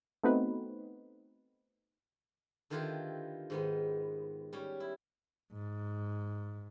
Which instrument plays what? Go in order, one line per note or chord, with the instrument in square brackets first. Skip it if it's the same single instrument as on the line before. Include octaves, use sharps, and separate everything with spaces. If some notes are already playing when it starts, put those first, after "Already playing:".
[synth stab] A3 B3 C4 D#4 F#4 B4
[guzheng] D3 D#3 E4 F4 G4 B4
G#2 D#3 B3
G3 C#4
E4
[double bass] G#2